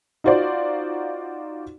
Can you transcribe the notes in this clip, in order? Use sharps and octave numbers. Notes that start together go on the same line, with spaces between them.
D#4 F4 F#4 C5 D5